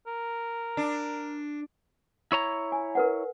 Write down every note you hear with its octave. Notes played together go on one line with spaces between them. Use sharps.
A#4
D4
E4 C#5 A#5
G#5
A#4 B4 F#5